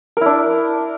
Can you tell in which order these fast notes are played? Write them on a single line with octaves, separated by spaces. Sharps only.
A#4 E4 D4